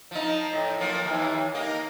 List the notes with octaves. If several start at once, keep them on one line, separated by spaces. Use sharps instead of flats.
F3 D#4
A2
F3 F#3 A#3
D#2 E3
A#3 D#4